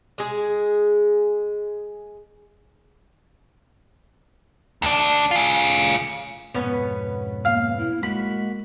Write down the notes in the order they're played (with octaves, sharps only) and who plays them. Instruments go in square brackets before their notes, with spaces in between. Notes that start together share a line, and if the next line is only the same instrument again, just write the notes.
[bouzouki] G#3 G#4
[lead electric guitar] D2 D4
F4 G#4
[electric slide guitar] F2 G#2 B2 [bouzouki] B3 C#4 B4
[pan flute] A#3 [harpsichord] F5
[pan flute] E4
[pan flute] G#3 [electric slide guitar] A#3 F#4 [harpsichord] B5